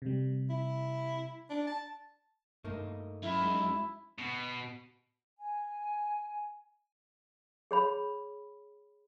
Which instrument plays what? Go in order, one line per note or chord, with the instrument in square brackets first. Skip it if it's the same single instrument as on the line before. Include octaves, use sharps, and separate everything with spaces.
[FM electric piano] C3 G3
[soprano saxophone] E4
D4
A5
[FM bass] G2 [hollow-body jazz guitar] A3 A#3 D#4
[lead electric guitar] F#2 [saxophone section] E4
[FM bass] G#3 [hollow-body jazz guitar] D#4
[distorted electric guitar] B2
[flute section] G#5
[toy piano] G#4 C#5 B5